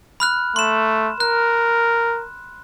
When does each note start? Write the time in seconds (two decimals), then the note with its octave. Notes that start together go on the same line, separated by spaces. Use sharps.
0.20 B5 F6 F#6
0.56 A3 C6 E7
1.20 A#4 F#6